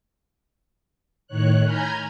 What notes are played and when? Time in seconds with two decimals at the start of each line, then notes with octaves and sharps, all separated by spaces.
1.27 A2 D#3 C#5 F#6
1.64 G#5 A#5 B5 F6 G6 G#6